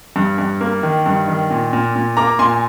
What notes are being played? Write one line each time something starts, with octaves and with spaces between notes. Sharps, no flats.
G2
G2
A#3
D#3
G2
D#3
A#2
A#2
A#2
A#3 A#5 D6
A#2 G#5 C6